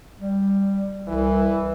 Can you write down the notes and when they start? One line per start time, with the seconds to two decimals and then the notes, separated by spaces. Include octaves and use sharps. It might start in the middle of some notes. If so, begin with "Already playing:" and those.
0.20 G3
1.08 C2 E3